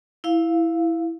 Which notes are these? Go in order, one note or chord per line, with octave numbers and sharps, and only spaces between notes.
E4 F5